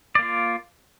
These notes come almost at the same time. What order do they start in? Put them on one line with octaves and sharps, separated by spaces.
D5 A#3 F4